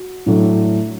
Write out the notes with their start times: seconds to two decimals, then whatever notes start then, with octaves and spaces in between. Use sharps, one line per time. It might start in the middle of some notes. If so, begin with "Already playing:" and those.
Already playing: F#4
0.26 A2 F#3 A3 D4